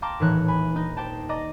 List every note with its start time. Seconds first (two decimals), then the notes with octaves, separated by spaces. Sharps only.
0.02 F5 G5 A5 A#5 C6 D6
0.20 D#1 A2 E3 D#4 C#5 F#6
0.48 G#5 B5
0.76 D#4
0.97 G4 C5 G5 A5
1.29 D5 D#5 A#5 D6 A#6